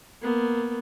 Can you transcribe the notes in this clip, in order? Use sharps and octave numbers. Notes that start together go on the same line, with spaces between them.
A#3 B3